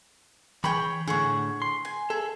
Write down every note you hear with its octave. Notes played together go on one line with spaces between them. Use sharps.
E3 G#4 C#5 G5 B5
A2 D3 G#4 F#5 C#6
C6
G#5
G#4 A4 E5